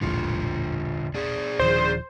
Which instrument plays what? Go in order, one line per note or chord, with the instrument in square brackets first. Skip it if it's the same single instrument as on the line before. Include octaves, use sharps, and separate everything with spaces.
[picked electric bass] E1 A#1 A2 [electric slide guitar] D3 F4
[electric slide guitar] D4 G#4
[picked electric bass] D#1 D#3 F3 [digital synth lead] C5